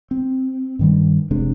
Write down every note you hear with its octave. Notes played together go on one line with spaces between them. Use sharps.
C4
G2 D#3 G3
F1 C3 G#3 D4